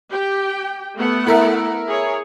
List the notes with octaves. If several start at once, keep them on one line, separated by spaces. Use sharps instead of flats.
G4 G5
A3 B3 F#5
E4 A#4 E5
G#4 C#5